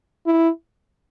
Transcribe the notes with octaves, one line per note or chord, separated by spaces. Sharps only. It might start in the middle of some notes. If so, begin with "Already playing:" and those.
E4